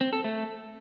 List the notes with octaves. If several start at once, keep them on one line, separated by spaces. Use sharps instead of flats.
C4
A4
A3